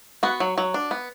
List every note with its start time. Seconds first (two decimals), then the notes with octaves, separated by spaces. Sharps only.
0.23 B3 F#4
0.40 F#3
0.58 F#3
0.74 D4
0.91 B3